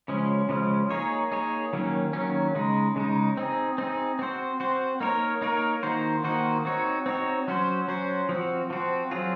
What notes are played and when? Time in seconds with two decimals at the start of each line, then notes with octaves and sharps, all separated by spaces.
0.08 C#3 F3 G#3 C#4
0.49 C#3 F3 G#3 C#4
0.91 A#3 D#4 G#4 C#5
1.32 A#3 D#4 G#4 C#5
1.73 D#3 F#3 A#3 C#4
2.13 D#3 F#3 A#3 C#4
2.55 C#3 G#3 D#4
2.96 C#3 G#3 D#4
3.37 C4 D#4 G#4
3.78 C4 D#4 G#4
4.19 C4 F#4 C5
4.60 C4 F#4 C5
5.01 A#3 D#4 A#4 C#5
5.42 A#3 D#4 A#4 C#5
5.83 D#3 A#3 D#4 F#4 C5
6.24 D#3 A#3 D#4 F#4 C5
6.65 C4 D#4 F#4 C#5
7.06 C4 D#4 F#4 C#5
7.48 F#3 C#4 F#4 C5
7.88 F#3 C#4 F#4 C5
8.29 F3 C4 F#4
8.70 F3 C4 F#4
9.11 F#3 C4 F4 G#4